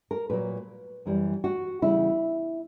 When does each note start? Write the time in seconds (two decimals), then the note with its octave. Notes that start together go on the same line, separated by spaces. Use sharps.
0.11 A#4
0.30 A#2 F#3 B4
1.06 F#2 E3 G3
1.44 F#4
1.82 E2 C#3 G3 E4